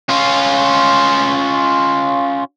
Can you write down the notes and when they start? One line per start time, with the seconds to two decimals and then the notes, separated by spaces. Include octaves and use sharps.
0.09 C#4 F4